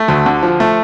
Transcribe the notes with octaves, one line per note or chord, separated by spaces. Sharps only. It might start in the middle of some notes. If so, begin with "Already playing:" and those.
Already playing: A3
D2
D3
F3
A3